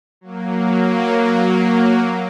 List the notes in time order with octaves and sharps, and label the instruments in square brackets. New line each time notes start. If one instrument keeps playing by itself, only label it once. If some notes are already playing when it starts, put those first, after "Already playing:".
[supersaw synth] F#3 A#3